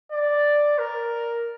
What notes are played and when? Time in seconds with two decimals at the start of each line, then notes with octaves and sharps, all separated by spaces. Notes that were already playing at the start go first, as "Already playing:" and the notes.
0.12 D5
0.79 A#4